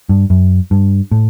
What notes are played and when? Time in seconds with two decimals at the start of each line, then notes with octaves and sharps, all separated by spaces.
0.09 G2
0.30 F#2
0.71 G2
1.11 A2